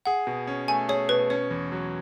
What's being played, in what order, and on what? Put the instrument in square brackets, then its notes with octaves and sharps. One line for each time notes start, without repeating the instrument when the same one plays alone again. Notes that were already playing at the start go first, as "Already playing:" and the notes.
[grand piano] G#4 [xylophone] F#5
[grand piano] B2
C#4
[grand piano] A3 [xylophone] G#5
[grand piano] G#4 [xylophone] C#5
[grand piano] B2 [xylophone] B4
[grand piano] C#4 [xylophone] C#5
[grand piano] E2
F#3